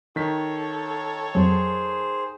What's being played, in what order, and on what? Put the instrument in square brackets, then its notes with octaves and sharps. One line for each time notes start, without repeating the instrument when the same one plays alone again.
[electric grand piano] D#3 B6 [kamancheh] A4 C#5
[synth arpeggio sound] F2 F#3 [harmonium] G#4 C5